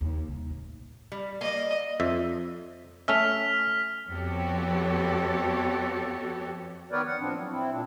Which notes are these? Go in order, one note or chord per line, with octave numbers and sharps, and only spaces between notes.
D#2
C2
A2
G3
A#3 D5 D#5
F2 E5
A3 C#4 E5 F6 B6 F7
F2 B3 F#4 G4 A4 C#5
D#3 B3 A#4 B4 C#5 D5
F#5
A2 F3 B3 C4 D4
F#3
C4 E4
A#2 D4